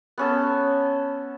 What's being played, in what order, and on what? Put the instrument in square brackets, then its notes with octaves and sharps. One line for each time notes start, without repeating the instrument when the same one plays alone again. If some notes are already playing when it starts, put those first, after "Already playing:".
[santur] B3 C#4 A4